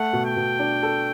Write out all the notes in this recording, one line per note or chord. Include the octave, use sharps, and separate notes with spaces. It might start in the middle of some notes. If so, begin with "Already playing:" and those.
Already playing: A3 F#5
B2
G5
B2
D4
A4